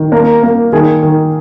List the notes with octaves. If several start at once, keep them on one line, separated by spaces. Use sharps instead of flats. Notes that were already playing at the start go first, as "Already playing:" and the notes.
Already playing: D#3
A#3 A#4 A#5
A#3
D#3 G#4 G#5
D#3